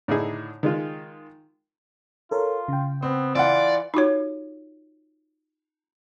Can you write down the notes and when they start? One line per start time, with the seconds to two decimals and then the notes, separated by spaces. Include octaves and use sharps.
0.08 A2 D3 D#4 E4 G#4
0.63 D#3 G#3 F4
2.31 F4 A4 A#4 C#5
2.68 C#3 G5
3.02 B3 C4
3.35 E3 F4 D5 F#5
3.94 D#4 F4 F#4 C#5